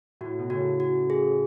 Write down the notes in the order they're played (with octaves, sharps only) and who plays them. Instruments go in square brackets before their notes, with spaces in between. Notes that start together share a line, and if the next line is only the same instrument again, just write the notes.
[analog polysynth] A2 [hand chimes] F#4
[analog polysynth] B2
[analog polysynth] A2 C#3 [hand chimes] F#4
[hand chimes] F#4
G#4